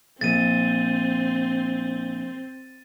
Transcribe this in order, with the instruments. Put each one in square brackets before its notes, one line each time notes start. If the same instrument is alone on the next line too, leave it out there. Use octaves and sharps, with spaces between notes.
[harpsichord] A#1 [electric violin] C4 [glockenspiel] A6 D#7